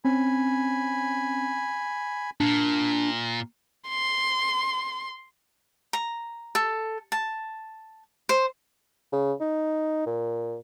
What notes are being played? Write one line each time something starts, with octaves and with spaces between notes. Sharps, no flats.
C4 C#4 G#5 B5
A#2 D4
C6
A#5
A4
A5
C5
C#3
D#4
A#2